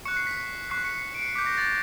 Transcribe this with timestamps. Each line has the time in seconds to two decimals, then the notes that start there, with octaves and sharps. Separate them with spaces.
0.05 C#6 F#6 C#7
0.17 C7
0.27 B6
0.70 C#6 F#6 C7
0.85 C#7
0.98 C7
1.15 D7
1.22 C#7
1.28 C7
1.36 D6 G6 B6
1.46 A#6
1.58 A6